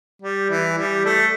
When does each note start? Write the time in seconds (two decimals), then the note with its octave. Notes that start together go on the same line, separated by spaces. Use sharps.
0.22 G3
0.50 E3
0.78 G3
1.06 A3